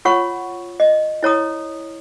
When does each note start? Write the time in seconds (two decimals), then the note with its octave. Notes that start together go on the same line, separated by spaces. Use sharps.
0.05 F4 C#5 F#5 C#6
0.80 D#5
1.23 E4 C#5 A#5 D#6